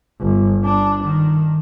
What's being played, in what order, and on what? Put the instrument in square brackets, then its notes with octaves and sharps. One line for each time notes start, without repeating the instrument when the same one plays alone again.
[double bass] G1
D4
D#3